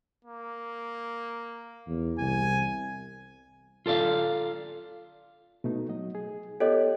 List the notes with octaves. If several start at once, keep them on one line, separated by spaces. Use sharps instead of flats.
A#3
E2
C2 G#5
F4 A4 D5 F5
B2 A3 D#4
F#3 D#5
G#4
B3 F4 G4 A4 C#5 D#5